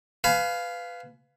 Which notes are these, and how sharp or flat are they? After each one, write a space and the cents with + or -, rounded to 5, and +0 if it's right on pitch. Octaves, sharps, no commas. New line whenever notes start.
B4 +15 F5 +0 G#5 +30